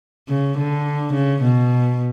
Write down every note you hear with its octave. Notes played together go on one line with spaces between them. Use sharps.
C#3
D3
C#3
B2